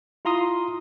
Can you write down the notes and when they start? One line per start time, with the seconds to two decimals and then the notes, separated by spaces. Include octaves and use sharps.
0.25 E4 F4 A#5 C6 D#6